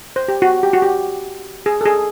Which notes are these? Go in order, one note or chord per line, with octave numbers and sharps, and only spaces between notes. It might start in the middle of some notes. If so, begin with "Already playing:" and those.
C5
G4
F#4
G4
F#4
G4
G#4
A4
G#4